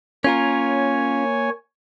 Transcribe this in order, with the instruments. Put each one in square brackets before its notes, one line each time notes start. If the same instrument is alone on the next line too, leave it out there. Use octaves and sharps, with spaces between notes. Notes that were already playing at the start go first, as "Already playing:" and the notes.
[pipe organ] A#3 C#5 G#5 [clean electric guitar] C#4 F4 A#4